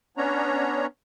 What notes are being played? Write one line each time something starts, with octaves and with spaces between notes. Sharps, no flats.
B3 C#4 D4 C#5 A#5